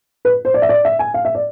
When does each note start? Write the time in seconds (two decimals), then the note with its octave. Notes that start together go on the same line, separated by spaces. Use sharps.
0.25 B4
0.45 C5
0.54 D5
0.62 E5
0.69 D5
0.85 E5
0.99 G#5
1.14 F5
1.25 E5
1.35 D5